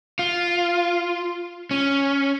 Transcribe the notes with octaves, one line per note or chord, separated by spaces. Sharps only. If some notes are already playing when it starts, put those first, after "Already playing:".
F4
C#4